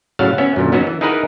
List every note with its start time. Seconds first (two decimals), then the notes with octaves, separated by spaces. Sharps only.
0.19 A2 C#3 F#3 F5 F#5 A5
0.38 B3 C#4 C#5 E5
0.56 F#2 A#2 D3
0.72 F#3 B3 C#4 D#4 F#4
0.87 E3
1.01 D#4 E4 G#4 A#4 B4 F#5